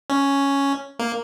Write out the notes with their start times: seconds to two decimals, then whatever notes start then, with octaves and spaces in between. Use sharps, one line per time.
0.10 C#4
0.99 A#3